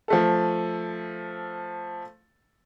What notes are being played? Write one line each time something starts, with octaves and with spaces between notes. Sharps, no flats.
F3 A3 A4